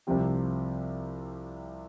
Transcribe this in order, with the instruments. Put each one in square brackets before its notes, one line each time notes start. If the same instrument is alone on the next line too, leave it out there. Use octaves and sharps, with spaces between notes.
[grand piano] C2 C3 F3 C4 G4